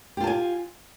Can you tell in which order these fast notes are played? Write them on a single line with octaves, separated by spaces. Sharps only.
G4 F4 A5 G#5